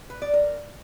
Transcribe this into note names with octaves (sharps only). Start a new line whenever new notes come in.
B4
D5
A#4